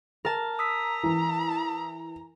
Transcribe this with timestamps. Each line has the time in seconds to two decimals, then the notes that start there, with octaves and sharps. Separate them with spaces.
0.25 A#4 A5
0.59 A#5 D#6 E6 B6
1.03 E3